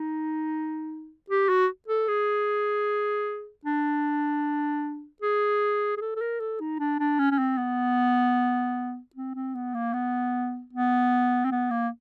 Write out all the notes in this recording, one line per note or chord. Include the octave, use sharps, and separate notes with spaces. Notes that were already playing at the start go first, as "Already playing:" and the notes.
Already playing: D#4
G4
F#4
A4
G#4
D4
G#4
G#4
A4
A4
A#4
A4
D#4
D4
D4
C#4
C#4
C4
B3
C4
C4
B3
A#3
B3
B3
C4
B3
A#3